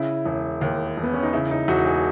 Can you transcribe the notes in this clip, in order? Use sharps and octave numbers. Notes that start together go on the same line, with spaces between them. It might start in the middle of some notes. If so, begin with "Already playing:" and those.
Already playing: C#3 E4
E1
D#2
E1
B3
C#4
D#4
C#3 E4
D#4
E1 F#4
G#4